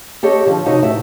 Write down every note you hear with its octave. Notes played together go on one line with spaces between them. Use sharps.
G4 A4 C#5 D#5
D3 F3
C3 D#4 F#4 C#5
A2 E5